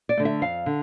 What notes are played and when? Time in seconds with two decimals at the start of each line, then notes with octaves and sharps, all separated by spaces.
0.09 D5
0.17 D3 A3
0.25 E5
0.42 F2 F5
0.66 D3